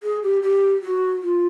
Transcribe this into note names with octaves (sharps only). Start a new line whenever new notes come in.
G#4
G4
G4
F#4
F4